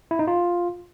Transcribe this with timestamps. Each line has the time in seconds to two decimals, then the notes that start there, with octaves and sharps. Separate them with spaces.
0.11 E4
0.19 D#4
0.28 F4